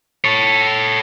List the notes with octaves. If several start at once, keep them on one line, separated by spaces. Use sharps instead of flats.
A4 C#5